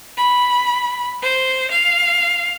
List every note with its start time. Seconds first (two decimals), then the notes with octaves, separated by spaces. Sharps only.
0.17 B5
1.22 C5
1.71 F5